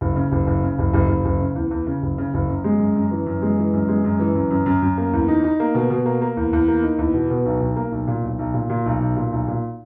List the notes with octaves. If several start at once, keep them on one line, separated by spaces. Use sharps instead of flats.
F#1
C#3
F#1
F#1
C#3
F#1
F#1
F#1
F#1
C#3
E2
E2
C#3
F#1
C#3
F#1
F#2
G#3
F#2
F#2
E3
F#2
G#3
E3
F#2
G#3
F#2
E3
F#2
F#2
F#2
F#2
A#3
E2
D#4
D#4
A#3
B2
B2
A#3
A#3
E2
E2
A#3
D#4
E2
B2
B2
B1
B1
A#3
B1
A#2
B1
B1
A#2
A#2
B1
B1
A#2
B1
A#2